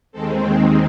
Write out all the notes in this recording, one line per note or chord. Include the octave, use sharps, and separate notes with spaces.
D#2 D#3 G#3 C4 A4